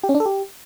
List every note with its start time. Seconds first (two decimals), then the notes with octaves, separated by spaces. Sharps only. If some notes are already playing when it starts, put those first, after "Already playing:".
0.03 G4
0.09 C#4
0.15 D4
0.20 A4
0.26 G4